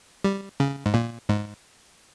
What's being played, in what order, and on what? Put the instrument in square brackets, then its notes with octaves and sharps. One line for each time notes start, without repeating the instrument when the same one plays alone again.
[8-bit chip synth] G3
C#3
G#2
A#2
G#2